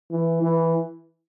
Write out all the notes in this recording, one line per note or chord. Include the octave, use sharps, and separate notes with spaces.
E3
E3